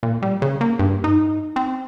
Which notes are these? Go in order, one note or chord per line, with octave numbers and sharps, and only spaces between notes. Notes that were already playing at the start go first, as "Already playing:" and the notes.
A#2
G3
C#3
A#3
G2
D#4
C4